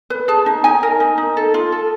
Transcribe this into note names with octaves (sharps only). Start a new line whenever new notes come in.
B4
G#4 A5
D#4
D#4 G#5
A#4
D#4
D#4
A4
F4
A4